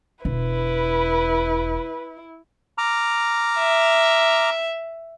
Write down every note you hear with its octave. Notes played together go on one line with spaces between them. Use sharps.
E1 E4 B4
A#5 D6 F6
E5